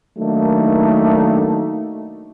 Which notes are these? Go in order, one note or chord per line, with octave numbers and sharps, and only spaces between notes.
D#3 F#3 A3 A#3 D4 D#4